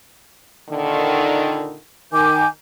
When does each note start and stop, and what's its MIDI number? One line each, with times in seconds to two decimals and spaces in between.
0.69 1.77 46
0.69 1.77 50
0.69 1.77 51
2.12 2.44 51
2.12 2.47 80
2.12 2.47 86
2.12 2.47 91